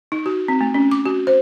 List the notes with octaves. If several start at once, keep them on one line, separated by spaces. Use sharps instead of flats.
D#4
F#4
C4
A3
C#4
D6
F#4
C5